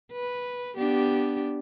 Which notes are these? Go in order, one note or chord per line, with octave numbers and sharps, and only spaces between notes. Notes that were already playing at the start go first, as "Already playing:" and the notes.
B4
B3 D4 G4